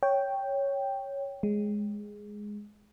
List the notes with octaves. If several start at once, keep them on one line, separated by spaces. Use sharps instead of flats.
C#5 G5
G#3